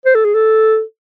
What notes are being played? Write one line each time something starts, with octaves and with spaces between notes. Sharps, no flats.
C5
A4
G#4
A4